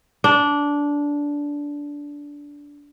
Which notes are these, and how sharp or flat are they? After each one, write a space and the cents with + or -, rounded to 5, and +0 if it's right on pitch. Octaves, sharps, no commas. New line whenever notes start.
D4 -15